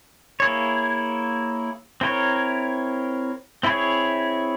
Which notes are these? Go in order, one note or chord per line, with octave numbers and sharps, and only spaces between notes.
A#3 E4 G#4 C#5
C4 E4 A#4 C#5
C4 E4 G#4 C#5